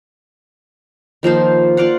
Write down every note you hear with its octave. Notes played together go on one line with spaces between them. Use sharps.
D#3 F3 A#3 C5
F4 D5 F5 F#5